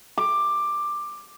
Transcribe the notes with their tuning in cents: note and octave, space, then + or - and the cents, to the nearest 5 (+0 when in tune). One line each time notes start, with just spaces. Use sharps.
D6 +10